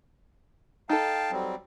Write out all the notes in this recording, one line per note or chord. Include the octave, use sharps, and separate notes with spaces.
D#4 A4 F5 G5 A5
F#3 G3 C4